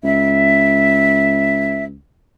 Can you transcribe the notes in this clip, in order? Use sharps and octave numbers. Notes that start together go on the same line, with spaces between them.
C#2 E5